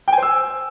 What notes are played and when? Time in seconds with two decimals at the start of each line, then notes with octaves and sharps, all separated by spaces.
0.08 G5
0.13 G#5
0.18 C5
0.23 E6